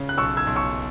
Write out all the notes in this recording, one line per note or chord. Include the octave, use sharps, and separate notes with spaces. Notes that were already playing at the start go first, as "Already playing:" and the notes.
Already playing: C#3
F#6
B1 C#6 E6
E6 G#6
B1
C#6 E6